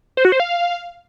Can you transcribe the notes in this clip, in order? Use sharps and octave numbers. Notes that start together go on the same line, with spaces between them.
C5
F#4
C5
F5